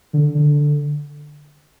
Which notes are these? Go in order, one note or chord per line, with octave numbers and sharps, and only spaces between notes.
D3
D3